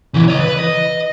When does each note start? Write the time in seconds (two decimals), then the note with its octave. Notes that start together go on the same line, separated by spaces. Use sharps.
0.14 C#3 E3
0.28 C#5 D#5
0.40 B4
0.59 D#5